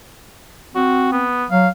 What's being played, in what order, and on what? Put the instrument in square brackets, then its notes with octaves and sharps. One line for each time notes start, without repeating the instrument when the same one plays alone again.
[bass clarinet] C4 [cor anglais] F#4
[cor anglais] B3
[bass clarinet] F#3 [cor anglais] F5